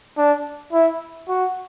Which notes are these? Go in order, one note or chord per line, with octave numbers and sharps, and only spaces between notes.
D4
E4
F#4